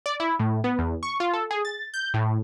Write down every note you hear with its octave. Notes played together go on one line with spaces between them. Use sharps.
D5
E4
A2
B3
E2
C#6
F4
A4
G#4
A6
G6
A2